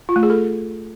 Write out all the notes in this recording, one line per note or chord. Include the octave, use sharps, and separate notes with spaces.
F4
A3
G#4
A4